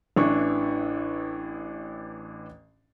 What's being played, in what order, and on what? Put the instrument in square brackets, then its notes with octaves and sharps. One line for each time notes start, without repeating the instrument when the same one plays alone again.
[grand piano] A1 E3 D4 C#6